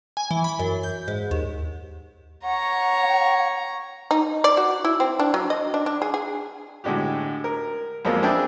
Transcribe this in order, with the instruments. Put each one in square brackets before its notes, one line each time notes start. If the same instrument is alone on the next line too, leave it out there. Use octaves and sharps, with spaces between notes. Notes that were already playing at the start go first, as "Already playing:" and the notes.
[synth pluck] G#5
E3
B5
F#2
G6
G#2
D#2
[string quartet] C#5 A#5 C#6 [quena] F#5
[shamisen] D#4
D5
F#4
E4
C4
D4
F#3
D#5
D4
D4
G#4
G#4
[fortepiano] A2 D3 G#3 F#4 G4
A#4
F2 F3 F#3 G#3 A#3
C4 D4 G#4 B4 E5 G5